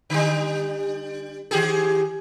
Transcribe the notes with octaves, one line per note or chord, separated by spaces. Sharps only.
D3 G3
D#3 G4 G#4